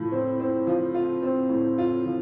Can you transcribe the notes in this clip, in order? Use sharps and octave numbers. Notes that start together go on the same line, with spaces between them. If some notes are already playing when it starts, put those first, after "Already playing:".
Already playing: A2 F3
C4
C4
F3
F4
C4
A2
F4
F3